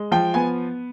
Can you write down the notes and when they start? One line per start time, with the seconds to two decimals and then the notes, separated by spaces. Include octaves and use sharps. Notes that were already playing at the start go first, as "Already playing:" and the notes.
Already playing: G#3
0.12 F3 G5
0.34 B3 G#5